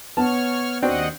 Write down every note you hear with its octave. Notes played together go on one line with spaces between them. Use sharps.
B3 C#5 A5 F6
D#2 C4 D4 F#4 D#5 F#5